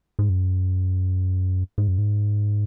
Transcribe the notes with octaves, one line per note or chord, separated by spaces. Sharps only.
G#2
F#2
G#2
F#2
G#2